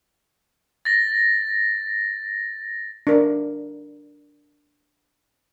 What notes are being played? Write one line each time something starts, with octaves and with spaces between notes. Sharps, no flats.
A6 A#6
D4 A#4